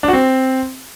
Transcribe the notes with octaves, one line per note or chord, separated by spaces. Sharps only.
D4
F#4
C4